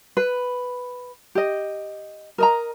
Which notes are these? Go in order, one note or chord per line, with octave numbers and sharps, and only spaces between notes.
B4
G4 D#5
A#4 D#5 A#5